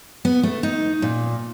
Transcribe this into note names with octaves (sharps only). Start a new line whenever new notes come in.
B3
A3
D#4
A#2